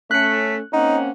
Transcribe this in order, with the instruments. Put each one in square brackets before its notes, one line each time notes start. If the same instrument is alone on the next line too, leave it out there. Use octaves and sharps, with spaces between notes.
[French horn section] A3 C#4 [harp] F#6 C#7 [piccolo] B6
[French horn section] A#3 C4 C#4 [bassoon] D#4 [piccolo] F#5